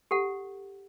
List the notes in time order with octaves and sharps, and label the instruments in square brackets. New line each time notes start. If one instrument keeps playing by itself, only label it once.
[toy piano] G4 A4 F#5